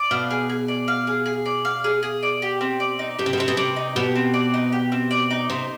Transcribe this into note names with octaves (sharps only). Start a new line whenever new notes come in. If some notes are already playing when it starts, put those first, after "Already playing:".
Already playing: D5
B2 F5
G#4
G#4
D5
F5
G#4
G#4
D5
F5
G#4
G#4
D5
G4
C4
D5
D#4
B2 G4
C3
B2
C3 C4
B2
C3 D5
D#4
B2 G4
C4
D5
D#4
G4
C4
D5
D#4
C3 C5